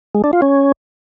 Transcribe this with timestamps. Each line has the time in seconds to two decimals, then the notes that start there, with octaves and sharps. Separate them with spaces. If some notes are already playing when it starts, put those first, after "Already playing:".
0.15 G#3
0.24 D4
0.33 F4
0.42 C#4